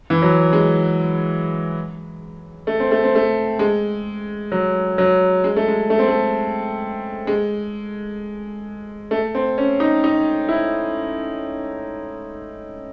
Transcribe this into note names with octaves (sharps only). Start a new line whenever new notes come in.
E3
F#3
G#3
A3
C4
A3
C4
A3
G#3
F#3
F#3
G#3
A3
G#3
A3
C4
A3
G#3
A3
C4
C#4
D#4
D#4
E4